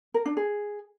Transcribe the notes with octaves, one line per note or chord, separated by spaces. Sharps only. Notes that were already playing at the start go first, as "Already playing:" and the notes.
A#4
D4
G#4